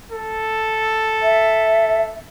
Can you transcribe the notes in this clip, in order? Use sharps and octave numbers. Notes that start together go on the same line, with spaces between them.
A4
E5